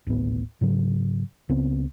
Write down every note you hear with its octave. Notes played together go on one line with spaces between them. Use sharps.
D1 G#1 A2 B3
G#2 C#3 F#3
C#2 C#3 B3 C4